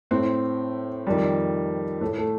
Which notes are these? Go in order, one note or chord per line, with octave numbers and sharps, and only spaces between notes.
A2 C4
F2 D#3 G3
A2 A3
A3